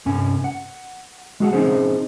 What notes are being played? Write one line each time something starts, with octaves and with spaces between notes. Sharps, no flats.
C2 G2 C#4 G#5
F#5
G#3 F#4 G#4 F5 F#5
C4 C#4 D#4 G#4 C5